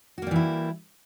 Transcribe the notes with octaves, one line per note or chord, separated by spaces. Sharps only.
E3 G3 A#3 E4 F#4